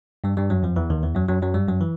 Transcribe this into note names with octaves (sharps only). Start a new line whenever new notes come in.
G2 G3
G2 G3
F#2 F#3
F2 F3
E2 E3
D#2 D#3
E2 E3
F#2 F#3
F#2 F#3
F#2 F#3
G2 G3
F#2 F#3
E3